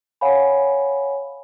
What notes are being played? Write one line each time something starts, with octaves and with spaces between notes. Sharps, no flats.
C#5 F5 F#5 G#5 B5